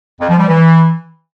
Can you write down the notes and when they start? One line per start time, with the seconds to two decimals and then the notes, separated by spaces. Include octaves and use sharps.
0.20 F2
0.29 F3
0.38 G3
0.48 E3